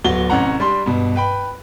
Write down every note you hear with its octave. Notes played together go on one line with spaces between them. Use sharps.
D1 F#3 B3 G7
A1 C3 C#4 F#5 A#5
G3 D4 C6
G2 B2
B4 G5 B5